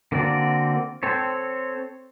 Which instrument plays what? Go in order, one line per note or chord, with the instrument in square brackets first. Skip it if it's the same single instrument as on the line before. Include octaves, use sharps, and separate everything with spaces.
[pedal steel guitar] D3 A#3 C4 F#4 D5
C4 A4 C5 C#5